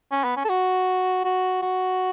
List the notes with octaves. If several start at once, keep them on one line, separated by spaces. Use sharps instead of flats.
C#4
B3
C#4
A4
F#4
F#4
F#4